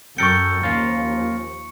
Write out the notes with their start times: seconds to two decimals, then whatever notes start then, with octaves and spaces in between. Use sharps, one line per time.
0.18 F#2 A4 A#4 G5 C#6 C#7
0.63 D#2 F3 A#3 C#4 F4